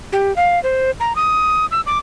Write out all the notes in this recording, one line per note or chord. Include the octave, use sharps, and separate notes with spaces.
G4
F5
C5
A#5
D#6
E6
D6